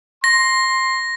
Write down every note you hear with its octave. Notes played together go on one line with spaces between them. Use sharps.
C6 A#6